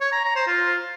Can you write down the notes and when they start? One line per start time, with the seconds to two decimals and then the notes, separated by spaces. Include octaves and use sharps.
0.01 C#5
0.12 A#5
0.24 A#5
0.36 C5
0.47 F4